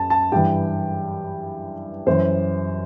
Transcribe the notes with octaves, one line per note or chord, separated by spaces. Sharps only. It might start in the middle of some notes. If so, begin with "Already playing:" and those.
Already playing: F#2 A5
A5
G2 E3 G5
F#2 E3 C5